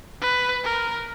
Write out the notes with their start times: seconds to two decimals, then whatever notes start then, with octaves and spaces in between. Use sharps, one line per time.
0.22 B4
0.64 A#4